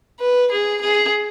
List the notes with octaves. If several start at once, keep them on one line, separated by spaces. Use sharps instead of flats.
B4
G#4
G#4